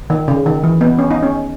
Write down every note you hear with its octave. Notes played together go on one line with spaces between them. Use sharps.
D#3
C#3
D#3
E3
B3
C#4
D#4
C#4